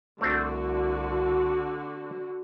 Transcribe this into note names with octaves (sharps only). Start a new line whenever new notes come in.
C2 D3 A3 C4 D4 F#4